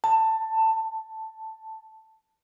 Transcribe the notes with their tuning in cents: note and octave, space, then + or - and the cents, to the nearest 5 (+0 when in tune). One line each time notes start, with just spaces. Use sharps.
A5 +20
A5 +5